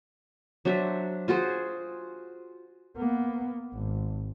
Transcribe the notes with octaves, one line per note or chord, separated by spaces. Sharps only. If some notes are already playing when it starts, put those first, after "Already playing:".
F#3 D4 C5 E5
F4 F#4 G#4 C5
A#3 B3
G#1